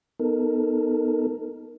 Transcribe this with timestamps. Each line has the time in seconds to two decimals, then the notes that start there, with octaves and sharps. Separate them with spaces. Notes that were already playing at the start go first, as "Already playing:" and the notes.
0.19 B3 D#4 A4 A#4